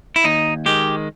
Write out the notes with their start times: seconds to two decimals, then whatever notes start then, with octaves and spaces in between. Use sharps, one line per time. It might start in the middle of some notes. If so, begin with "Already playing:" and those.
0.16 E4
0.24 D#2 D#4
0.66 D#3 G#3 G4